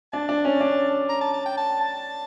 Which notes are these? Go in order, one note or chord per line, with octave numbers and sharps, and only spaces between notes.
D4 A5
D4
C#4
D4
A#5
A5
A5
G5
A5
A5